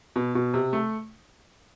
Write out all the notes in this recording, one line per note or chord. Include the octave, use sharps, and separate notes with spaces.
B2
B2
C3
A3